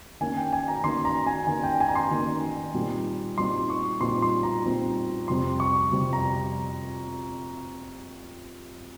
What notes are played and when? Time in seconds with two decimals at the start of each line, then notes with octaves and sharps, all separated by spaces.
0.21 D#3 A#3 C#4 G#5
0.37 G5
0.53 G#5
0.68 A#5
0.84 D#3 A#3 C#4 C6
1.05 A#5
1.26 G#5
1.47 D#3 A#3 C#4 G#5
1.63 G5
1.80 G#5
1.88 A#5
1.95 C6
2.11 D#3 A#3 C#4
2.74 A#2 G3 C4 D#4
3.38 A#2 G3 C4 D#4 C6
3.70 C#6
4.01 A#2 G3 C4 D#4 C6
4.22 C6
4.43 A#5
4.65 A#2 G3 C4 D#4
5.28 F2 C3 G3 C4 C6
5.60 C#6
5.91 F2 C3 G3 C4
6.13 A#5